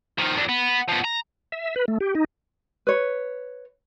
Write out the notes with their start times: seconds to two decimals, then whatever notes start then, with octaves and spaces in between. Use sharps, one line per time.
0.18 D#3 F3
0.35 F2 D4
0.49 B3
0.89 F3 B3
1.05 A#5
1.52 E5
1.76 B4
1.88 A3
2.01 G4
2.15 D#4
2.87 B4 C#5